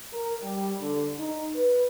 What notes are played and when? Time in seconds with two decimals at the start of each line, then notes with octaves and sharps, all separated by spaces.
0.12 A#4
0.42 G3
0.81 D3
1.18 D#4
1.55 B4